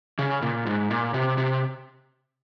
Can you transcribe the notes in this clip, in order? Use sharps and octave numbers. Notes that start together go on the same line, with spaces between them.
C#3
A#2
G#2
A#2
C3
C3